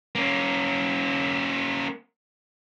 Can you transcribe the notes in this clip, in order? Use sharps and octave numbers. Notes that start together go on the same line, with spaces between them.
A#3 C#4